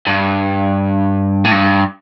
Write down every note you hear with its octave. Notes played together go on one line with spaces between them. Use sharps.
G2
A2
G2